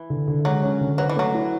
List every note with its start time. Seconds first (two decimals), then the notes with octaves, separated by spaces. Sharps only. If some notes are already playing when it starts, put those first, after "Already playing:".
Already playing: E3
0.10 D3
0.28 D3
0.45 F#3 G#3
0.63 C#4
0.81 D3
0.98 F#3 B4
1.09 E3
1.16 F#3 A3
1.34 E4